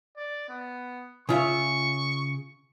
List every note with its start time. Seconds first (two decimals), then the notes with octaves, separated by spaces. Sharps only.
0.17 D5
0.49 B3
1.29 C#3 F4 E5 C#6